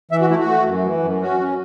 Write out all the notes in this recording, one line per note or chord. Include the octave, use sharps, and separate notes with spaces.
E3 E5
F#4
A3 E4
F#4
A3
F#2
E3
F#2
C#4 F#4
C#4